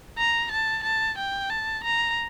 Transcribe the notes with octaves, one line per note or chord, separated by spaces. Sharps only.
A#5
A5
A5
G5
A5
A#5